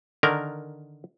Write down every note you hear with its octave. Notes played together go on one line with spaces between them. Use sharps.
D3 D#3 A#4